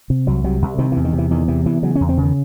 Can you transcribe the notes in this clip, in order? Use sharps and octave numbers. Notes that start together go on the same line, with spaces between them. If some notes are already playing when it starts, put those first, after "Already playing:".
C3
C2 F#3
C3 F#3
C2
C3 D#3
E3
E2
D#3
C3
E3
E2 D#3
C3 E3
E2 E3
C#3 F#3
C#4
E2
C4
C#3
D#3